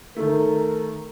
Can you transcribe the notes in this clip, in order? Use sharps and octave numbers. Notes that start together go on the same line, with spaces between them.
D#3 A3 A#4